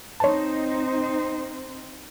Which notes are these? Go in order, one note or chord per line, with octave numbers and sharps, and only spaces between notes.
C4 D#4 C5 C#5 A5